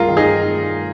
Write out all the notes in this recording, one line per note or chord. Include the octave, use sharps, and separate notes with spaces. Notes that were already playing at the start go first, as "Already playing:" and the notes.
Already playing: C2 G#3 F4 G#4 A#4
D#3
D#4 G#4